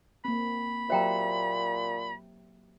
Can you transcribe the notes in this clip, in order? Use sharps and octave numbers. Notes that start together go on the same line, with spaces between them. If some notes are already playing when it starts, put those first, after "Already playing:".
A#3 C4 B5
A#2 F#3 G4 C5 E5 G5 A#5